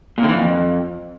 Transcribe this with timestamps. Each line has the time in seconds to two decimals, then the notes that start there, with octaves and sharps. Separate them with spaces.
0.18 A#2
0.23 D3
0.29 E3
0.34 F2